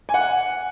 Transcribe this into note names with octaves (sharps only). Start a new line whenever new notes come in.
G#5
F#5